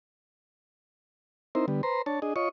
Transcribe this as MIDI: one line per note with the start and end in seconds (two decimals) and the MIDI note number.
1.55 1.66 60
1.55 1.66 63
1.55 1.66 64
1.55 1.66 70
1.55 1.66 72
1.68 1.82 50
1.68 1.82 55
1.68 1.82 59
1.83 2.02 71
1.83 2.02 72
1.83 2.02 82
1.83 2.02 84
2.06 2.20 62
2.06 2.20 73
2.06 2.20 81
2.22 2.34 62
2.22 2.34 68
2.22 2.34 75
2.36 2.49 65
2.36 2.49 73
2.36 2.49 75
2.36 2.49 85